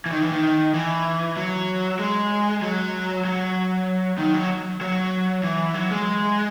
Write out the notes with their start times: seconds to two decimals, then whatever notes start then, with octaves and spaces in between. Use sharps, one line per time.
0.06 E3
0.11 D#3
0.22 E3
0.32 D#3
0.74 E3
1.37 F#3
1.99 G#3
2.62 F#3
3.25 F#3
4.18 D#3
4.34 F#3
4.81 F#3
5.44 E3
5.74 F#3
5.91 G#3